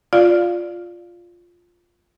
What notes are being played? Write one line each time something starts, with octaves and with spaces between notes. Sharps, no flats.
F4 D5 F5